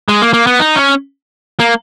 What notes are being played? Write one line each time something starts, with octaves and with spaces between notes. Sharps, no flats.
G#3
A#3
A#3
B3
D#4
C#4
A#3